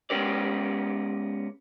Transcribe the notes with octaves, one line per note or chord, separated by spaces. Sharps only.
G#3 B3 C#4 G4 A#4 D5